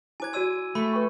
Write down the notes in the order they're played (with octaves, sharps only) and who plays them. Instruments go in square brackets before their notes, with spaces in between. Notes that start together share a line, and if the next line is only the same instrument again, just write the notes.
[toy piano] E4 C5 [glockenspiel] G#5 D6 G#6
[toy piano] F#4 D5 C6 [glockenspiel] G#5 E6 D#7
[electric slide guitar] A3 [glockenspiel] B5
[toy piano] B4 G5 C#6